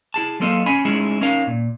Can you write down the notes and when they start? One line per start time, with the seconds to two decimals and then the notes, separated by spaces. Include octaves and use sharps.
0.14 E4 G#4 A5
0.40 F#3 A#3 C4 A4 D#5 F5
0.66 C#4 G#5 B5
0.85 G#3 A3 C#4 D#4 E4 G#4
1.21 C#4 D#4 A#4 F5
1.47 A#2